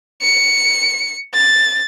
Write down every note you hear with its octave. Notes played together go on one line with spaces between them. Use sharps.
C#7
A6